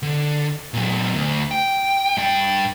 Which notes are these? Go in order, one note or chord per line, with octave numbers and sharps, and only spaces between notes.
D3
A#2 F#3
D2
G5
G2 G5